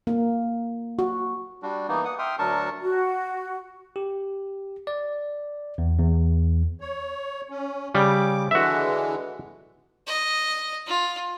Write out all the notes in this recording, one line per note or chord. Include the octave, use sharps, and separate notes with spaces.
A#3
F#4
G3 D4 F#4
E3 A#3 B3 D#4
F#5 D#6
E5 G5 C6 D#6 F6
D2 F#3 D4 A#4 A5 C#6
F#4
G4
D5
E2
E2
C#5
C#4
C#3 G3 D6
D3 E3 G#3 F#4 E5
D#5
F4